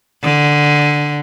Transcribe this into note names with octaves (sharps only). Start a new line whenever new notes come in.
D3